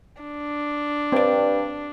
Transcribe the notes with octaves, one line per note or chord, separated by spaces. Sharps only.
D4
G2 C4 D5